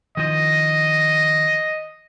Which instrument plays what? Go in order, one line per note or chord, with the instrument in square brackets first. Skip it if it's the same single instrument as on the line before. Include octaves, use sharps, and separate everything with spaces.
[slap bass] D#3 F3 [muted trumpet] D#5